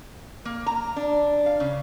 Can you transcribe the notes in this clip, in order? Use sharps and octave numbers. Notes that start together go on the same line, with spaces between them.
A#3
A#5
D4
F5
C#3